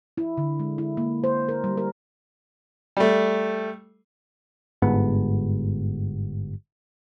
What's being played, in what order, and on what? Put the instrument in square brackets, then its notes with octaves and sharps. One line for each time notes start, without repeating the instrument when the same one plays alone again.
[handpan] E4
D3
G#3
E4
A#3
C5
A#4
G3
A#4
[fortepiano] G3 A3
[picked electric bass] G1 G#2 B3